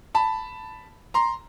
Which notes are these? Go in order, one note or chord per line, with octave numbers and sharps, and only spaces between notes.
A5 B5
A#5 C6